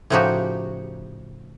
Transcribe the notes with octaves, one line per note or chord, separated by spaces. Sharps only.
A2 C#3 F3 D#4 F#4 G4